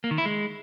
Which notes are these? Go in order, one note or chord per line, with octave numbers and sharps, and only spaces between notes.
A#3
D#3
E4
G#3